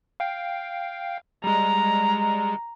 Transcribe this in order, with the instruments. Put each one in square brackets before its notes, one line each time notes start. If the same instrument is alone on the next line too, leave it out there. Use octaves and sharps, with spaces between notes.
[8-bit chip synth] F5 G5
[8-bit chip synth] G3 G#3 [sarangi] A#5